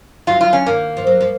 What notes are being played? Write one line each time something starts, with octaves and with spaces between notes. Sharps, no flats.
F#3 F4
F4
C#4
D#3 A#3
F3
F#3
F3